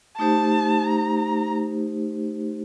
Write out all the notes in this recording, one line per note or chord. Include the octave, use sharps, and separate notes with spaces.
A3 D#4 G4 C5 A5
A#5